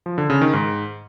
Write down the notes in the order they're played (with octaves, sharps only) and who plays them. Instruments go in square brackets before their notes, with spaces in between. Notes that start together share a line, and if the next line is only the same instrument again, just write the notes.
[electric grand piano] F3
D3
C#3
D#3
G#2